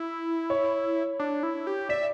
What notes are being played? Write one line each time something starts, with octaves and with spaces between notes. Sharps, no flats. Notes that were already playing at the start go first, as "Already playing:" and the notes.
Already playing: E4
C#5
D4
E4
G4
D5 E5